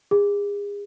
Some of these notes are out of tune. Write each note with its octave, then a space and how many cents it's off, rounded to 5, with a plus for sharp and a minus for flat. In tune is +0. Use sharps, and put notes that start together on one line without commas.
G#4 -35